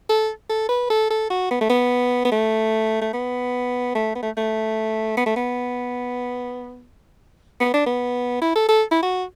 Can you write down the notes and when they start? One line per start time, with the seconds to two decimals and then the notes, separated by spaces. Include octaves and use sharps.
0.09 A4
0.50 A4
0.69 B4
0.90 A4
1.11 A4
1.30 F#4
1.51 B3
1.61 A3
1.70 B3
2.25 B3
2.32 A3
3.02 A3
3.14 B3
3.95 A3
4.15 B3
4.23 A3
4.37 A3
5.17 B3
5.26 A3
5.36 B3
7.61 B3
7.74 D4
7.87 B3
8.42 E4
8.56 A4
8.69 A4
8.92 E4
9.03 F#4